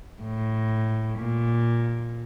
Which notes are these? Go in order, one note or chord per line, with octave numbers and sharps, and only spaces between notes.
A2
A#2